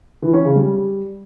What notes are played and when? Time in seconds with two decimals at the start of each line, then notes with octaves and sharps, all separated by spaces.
0.22 E3
0.33 C#4
0.45 C#3
0.56 G3